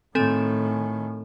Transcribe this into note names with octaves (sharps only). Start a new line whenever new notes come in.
A2 D#3 C4 A4 G#5